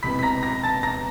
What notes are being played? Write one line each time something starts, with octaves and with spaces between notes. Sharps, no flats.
E1 E2 C3 B5 B6
B6
A#5 A#6
A#5 A#6
A5 A6
A#5 A#6